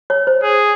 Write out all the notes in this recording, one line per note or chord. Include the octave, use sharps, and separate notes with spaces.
C#5
C5
G#4